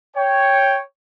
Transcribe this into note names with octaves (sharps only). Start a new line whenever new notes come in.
C#5 G5